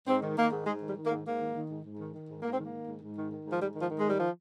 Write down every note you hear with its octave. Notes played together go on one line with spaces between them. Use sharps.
G#2 C4
D#3
D#3 A#3
G#2
G#2 G#3
D#3
G3
D#3
A#3
G#2
G#2 A#3
D#3
D#3
G#2
G#2
D#3
D#3
G#2
G#2 A#3
C4
D#3
A#3
D#3
G#2
G#2
D#3
D#3
G#2
F3
G#2 G3
D#3
F3
D#3
G#3
G#2 G3
F3